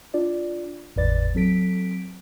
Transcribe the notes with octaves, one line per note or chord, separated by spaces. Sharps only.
D4 F4 D5
G#1 E2 A2 B4 D5 A6
F#3 C4 A4 B6 D7